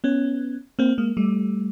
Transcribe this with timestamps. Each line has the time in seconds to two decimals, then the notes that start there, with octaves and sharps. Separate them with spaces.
0.04 B3 C#4
0.79 A#3 C4
0.98 G#3 A#3
1.17 G3 A3